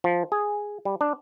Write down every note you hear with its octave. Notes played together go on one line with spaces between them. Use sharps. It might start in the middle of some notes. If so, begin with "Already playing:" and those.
F3
G#4
G3
D4